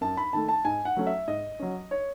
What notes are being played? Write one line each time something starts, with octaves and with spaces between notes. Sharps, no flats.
F#2 A5
B5
D#3 A3 A5
A5
G#2 G#5
F#5
F#3 A3 C#4
E5
G#2 D#5
F#3 C#4
C#5